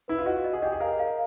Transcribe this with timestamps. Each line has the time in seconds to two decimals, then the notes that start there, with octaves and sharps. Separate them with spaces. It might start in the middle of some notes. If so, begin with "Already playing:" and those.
0.08 E4 B4
0.18 F4
0.26 F#4 D#5
0.44 D#5
0.53 G#4
0.62 G4 D#5
0.72 G#4
0.80 A#4 F5
0.99 F5